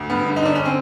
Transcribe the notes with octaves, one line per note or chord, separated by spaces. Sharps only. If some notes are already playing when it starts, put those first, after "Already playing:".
Already playing: D2
G2 B3
D3
D#4
D3 D4
C#4
C4